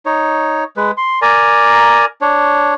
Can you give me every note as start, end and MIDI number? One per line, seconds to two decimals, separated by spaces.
0.06 0.64 63
0.06 0.64 73
0.77 0.91 56
0.77 0.91 71
0.97 1.19 84
1.22 2.06 70
1.22 2.06 74
1.22 2.06 80
1.22 2.06 82
2.21 2.75 62
2.21 2.75 73